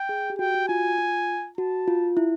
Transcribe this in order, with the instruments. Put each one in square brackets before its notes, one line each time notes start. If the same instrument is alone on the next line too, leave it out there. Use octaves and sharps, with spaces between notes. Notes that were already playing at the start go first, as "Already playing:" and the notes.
Already playing: [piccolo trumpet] G5
[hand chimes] G#4
G4
[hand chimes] F#4 [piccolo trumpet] G5
[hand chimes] F#4
[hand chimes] F4 [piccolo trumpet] G#5
[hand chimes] F4
[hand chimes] F#4 [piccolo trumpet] A5
[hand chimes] F4
E4